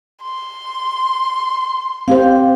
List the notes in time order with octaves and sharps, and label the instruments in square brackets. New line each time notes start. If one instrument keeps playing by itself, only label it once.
[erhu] C6
[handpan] C4 G4 C5 [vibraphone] F5